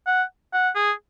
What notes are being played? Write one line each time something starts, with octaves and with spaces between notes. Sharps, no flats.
F#5
F#5
G#4